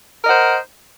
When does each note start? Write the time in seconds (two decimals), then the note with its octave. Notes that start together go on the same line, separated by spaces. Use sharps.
0.23 A#4
0.25 D#5
0.28 F#5
0.31 C5